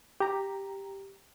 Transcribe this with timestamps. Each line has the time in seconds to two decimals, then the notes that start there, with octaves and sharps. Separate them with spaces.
0.20 G4 A#5